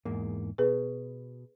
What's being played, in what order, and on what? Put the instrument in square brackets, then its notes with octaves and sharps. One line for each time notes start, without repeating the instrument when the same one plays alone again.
[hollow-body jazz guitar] E2 G#2 A#3
[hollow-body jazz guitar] B2 [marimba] G#4 B4